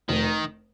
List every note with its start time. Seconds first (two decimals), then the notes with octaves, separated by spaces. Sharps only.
0.09 F1 D#3